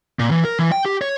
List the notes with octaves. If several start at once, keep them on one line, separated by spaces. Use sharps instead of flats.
A#2
E3
A#4
E3
G5
G4
C#5